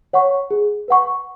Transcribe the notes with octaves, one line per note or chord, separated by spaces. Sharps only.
C#5 F#5 C#6
G#4
B4 F#5 C#6